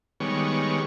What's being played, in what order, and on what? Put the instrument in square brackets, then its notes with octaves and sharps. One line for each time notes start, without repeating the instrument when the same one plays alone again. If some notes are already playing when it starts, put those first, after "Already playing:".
[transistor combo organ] D#3 G3 G#3 B3 C#5 C#6